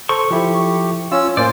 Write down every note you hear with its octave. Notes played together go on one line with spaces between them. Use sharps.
A4 C5 C#6
F3 E4 G4 A4
C#4 F4 E6
A2 A#3 C5 D5 G#5